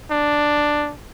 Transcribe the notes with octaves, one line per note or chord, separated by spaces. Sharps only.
D4